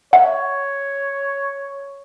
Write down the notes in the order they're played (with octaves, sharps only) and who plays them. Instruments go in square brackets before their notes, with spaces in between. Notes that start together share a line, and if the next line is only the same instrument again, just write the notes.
[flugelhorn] C#5 [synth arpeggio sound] E5 F#5